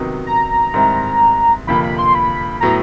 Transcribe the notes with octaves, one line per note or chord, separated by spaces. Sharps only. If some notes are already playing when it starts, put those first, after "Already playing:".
Already playing: C3 D#3 F#3 B3 D#4
A#5
G#2 D#3 G3 C4 E4
G1 F2 C3 F3 A#3 B5
B5
C6
B5
A2 F#3 B3 A#5